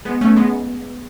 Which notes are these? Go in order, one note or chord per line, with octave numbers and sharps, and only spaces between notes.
G#3 B3
A3 C#4
G#3 B3